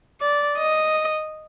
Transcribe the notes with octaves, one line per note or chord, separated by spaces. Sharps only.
D5
D#5